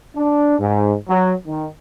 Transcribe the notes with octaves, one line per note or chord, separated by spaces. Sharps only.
D4
G#2
F#3
D#3